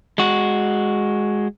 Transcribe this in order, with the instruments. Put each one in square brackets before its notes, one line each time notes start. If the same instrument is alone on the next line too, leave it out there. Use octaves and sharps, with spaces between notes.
[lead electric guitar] G#3 F#4